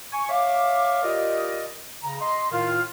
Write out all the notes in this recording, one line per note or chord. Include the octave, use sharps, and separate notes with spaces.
G#5 C#6
C#5 E5 F5 D6
F4 G4 A#4 D5 D#5
C#3 A#5
D#5 C6
A2 D#3 F4